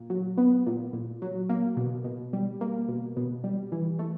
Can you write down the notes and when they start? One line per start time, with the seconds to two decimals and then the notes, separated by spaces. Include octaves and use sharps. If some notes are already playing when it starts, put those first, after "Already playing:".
Already playing: A#2
0.10 F#3
0.38 B3
0.66 A#2
0.93 A#2
1.22 F#3
1.49 A#3
1.77 B2
2.04 B2
2.33 G3
2.61 A#3
2.88 B2
3.17 B2
3.44 G3
3.72 E3
3.99 A3